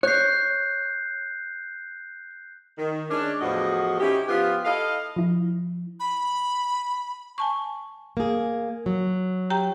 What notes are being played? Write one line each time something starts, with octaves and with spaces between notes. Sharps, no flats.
C#5 F#6 G6 C7
D#3
G#3 C#4 D4
E2 A2 F3 F#4 D#5
C#4 D#4 E4 G4
F3 B3 F4 G4
E4 A4 D#5 F5
F3 E4
B5
G#5 A5 C#6
A#3 G#4
F#3
G4 G5 A#5